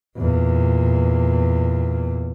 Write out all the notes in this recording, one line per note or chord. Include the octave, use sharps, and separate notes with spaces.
E2 A#2